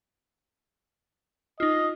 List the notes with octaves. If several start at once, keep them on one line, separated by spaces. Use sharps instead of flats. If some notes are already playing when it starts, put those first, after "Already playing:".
D#4 F4 D#5